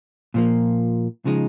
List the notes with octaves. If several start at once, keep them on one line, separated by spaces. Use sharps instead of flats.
A#2 F3 A#3
C#3 F3 G#3 D#4